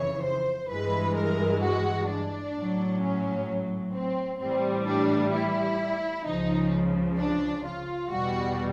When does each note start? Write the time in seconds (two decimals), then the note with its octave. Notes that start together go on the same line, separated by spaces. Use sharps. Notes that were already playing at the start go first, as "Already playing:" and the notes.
Already playing: F2 C#3 E3 C#5
0.24 C5
0.70 G2 E3 G#3 B4
1.16 A#4
1.62 F#4
2.09 D4
2.55 A2 F#3
3.02 C#4
3.93 C4
4.40 A2 E3 G3 C4
4.87 D4
5.33 E4
6.25 C#2 C#3 F3 D#4
7.17 D4
7.65 F4
8.10 E2 B2 G3 F#4